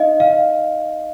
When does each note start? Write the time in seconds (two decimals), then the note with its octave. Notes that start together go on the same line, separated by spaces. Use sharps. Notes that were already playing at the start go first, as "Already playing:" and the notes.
Already playing: D#4 D#5 F5
0.20 F5